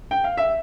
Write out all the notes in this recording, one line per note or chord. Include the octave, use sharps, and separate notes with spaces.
G5
F5
E5